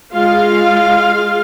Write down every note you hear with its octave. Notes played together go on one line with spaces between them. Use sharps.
G#3 F4 F5